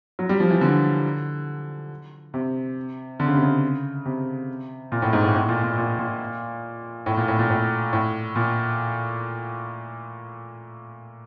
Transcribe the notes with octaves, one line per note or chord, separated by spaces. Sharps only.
F#3
G3
F3
E3
D3
C3
D3
C#3
C3
C#3
C3
A#2
A2
G#2
A2
A2
A#2
A#2
A#2
A#2
A2
A#2
A2
A#2
A2
A2
A#2